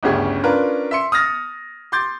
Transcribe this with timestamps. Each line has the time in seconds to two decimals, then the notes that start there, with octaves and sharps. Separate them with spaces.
0.03 G1 D2 C#3 C#4 G4 G#4
0.43 C#4 D4 F4 A#4 B4
0.91 E5 C6 C#7
1.12 D#6 F6 A6 A#6
1.92 C6 D6 G6 A6